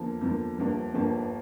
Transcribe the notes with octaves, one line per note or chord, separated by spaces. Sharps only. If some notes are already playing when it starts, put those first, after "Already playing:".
Already playing: E2 D3 F3 A#3
E2 D3 F3 A#3
G1 G2 F3 A#3
G1 G2 F3 A#3